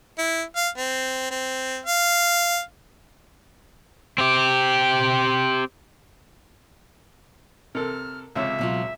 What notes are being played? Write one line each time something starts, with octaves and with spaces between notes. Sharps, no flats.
E4
F5
C4
C4
F5
C4 G4
C3 A4 A#4 F6
C#2 C3 C#5 E5
B2 F#3 F4